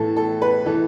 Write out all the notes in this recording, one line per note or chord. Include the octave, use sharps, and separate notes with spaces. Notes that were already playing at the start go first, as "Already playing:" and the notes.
Already playing: A2 E3 A4
A4
B4
E3 A4